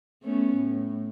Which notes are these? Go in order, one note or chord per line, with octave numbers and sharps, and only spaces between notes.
A3 B3 C#4
A2